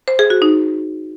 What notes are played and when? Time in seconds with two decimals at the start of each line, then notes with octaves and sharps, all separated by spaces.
0.08 C5
0.19 G#4
0.30 F#4
0.42 D#4